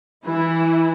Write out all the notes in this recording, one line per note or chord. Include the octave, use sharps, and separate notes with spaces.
E3 E4